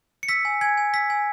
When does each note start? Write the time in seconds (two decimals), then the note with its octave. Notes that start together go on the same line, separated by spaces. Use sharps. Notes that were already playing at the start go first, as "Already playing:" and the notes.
0.23 C#7
0.29 E6 B6
0.45 G#5
0.61 G#5 G#6
0.77 G#5
0.94 E6 B6
1.10 G#5